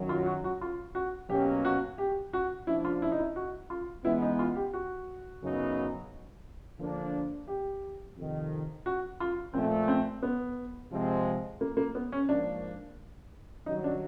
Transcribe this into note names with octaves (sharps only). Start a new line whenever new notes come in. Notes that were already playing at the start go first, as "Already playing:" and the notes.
Already playing: F#2 D#3 F#3
F4
F#4
F#4
F4
F#4
B2 F#3 A#3 C#4 G4
F#4
G4
F#4
F3 A#3 D4 E4
F4
E4
D#4
E4
F#4
F4
E3 G#3 B3 E4
D#4
F4
G4
F#4
F#2 C#3 F#3 B3 D#4
D3 F3 A#3 D4
G4
F2 C3 D#3
F#4
F4
A#2 F3 A3 C4
C4
B3
C3 F3 G#3 C4
A#3
A#3
B3
C#4
G#2 F3 A#3 D4
G2 D#3 F#3 D#4
D4